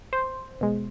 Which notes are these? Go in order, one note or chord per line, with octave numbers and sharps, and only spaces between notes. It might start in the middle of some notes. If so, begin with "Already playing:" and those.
C5
B2 G#3